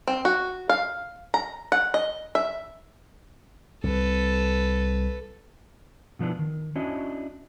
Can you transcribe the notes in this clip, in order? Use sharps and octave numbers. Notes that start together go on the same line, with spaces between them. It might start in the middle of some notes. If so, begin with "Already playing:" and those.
C4
F#4
F5
A#5
F#5
D#5
E5
C2 C3 A4 B4
B2 F3 B3 D4 E4
D#3
C#4 D4 E4 F#4 D#5